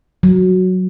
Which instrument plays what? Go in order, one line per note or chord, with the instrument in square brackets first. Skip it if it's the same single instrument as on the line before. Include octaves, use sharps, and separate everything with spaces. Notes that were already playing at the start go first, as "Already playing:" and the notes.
[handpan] F#3